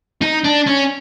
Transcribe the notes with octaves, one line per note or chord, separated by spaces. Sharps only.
D#4
D4
C#4